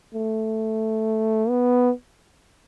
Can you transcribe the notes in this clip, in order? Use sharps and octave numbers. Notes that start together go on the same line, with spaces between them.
A3
B3